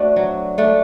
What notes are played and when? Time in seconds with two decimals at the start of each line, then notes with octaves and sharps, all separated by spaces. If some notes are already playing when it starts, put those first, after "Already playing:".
Already playing: A3 D4 F#4 C5 D5
0.16 F#3
0.58 A3 D4